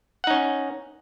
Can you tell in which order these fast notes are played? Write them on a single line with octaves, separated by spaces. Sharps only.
F#5 D#4 C#4